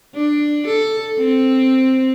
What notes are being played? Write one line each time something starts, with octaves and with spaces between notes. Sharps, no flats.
D4
A4
C4